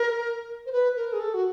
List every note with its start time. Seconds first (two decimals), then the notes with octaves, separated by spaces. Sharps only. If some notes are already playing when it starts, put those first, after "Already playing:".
Already playing: A#4
0.66 C5
0.72 B4
0.96 A#4
1.13 G#4
1.19 A4
1.34 F#4